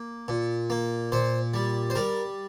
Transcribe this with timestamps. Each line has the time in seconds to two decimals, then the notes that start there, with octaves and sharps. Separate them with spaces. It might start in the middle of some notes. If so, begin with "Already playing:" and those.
Already playing: A#3
0.28 A#2
0.70 A#3
1.12 A#2 C5
1.54 G3
1.90 C5
1.95 G3 A#4